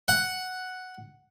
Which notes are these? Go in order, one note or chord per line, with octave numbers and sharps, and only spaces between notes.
F#5